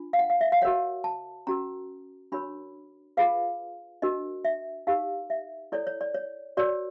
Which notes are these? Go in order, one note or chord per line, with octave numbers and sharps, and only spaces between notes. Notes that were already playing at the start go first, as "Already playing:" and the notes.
Already playing: D4 F4
F5
F#5
F5
E5
F5
F#4 A#4 C#5 F#5
A5
C#4 F#4 A#4 A#5
D4 F#4 A#4 C#5 B5
F4 G#4 B4 F5
D4 F#4 A#4 D#5
E5
D#4 G4 A#4 F5
E5
E4 A4 C#5 D5
C#5
D5
C#5
F#4 A#4 C#5 D5